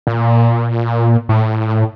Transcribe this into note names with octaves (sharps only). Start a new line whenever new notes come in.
A#2
A2